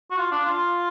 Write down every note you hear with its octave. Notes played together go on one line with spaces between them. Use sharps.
F#4
F4
D4
F4